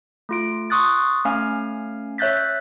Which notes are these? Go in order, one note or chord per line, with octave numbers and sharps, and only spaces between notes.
A3 F4 D7
C6 C#6 D#6 F#6 A6
A3 C#4 F5 G#5 F6
C#5 E5 F#6 G6 A6 B6